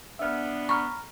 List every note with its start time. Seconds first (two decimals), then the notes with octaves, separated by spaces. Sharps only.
0.19 B3 D4 E5 F6
0.69 A#5 B5 C#6 F6